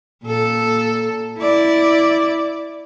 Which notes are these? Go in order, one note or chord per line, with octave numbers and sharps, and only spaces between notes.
A#2 A4
E4 D5